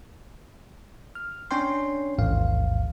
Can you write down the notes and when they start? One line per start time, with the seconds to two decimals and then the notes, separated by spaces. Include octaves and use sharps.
1.15 F6
1.51 C#4 D4 C#5 G5 C6
2.18 A1 D#2 G#2 F5